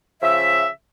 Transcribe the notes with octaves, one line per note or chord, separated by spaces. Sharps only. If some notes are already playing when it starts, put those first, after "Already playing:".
C#3 F3 E5